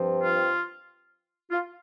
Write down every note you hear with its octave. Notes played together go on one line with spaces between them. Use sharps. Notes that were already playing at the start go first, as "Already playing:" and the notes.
Already playing: G2 F3 C4
F4
F4